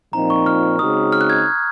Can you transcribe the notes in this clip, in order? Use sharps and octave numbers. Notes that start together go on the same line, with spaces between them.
A#2 F3 C4 D#4 A#5
C#6
F6
C#3 G#3 C4 D#4 F#4 D#6
F6
F#6
G#6